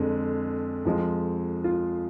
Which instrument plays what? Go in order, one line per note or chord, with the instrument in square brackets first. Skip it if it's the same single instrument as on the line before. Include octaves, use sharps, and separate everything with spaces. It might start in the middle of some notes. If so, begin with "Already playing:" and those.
Already playing: [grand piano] F2 D3 G#3
F2 F3 G#3
F4